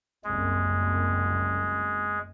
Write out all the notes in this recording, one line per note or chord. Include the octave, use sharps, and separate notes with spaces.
F#1 C2 F#2 G#3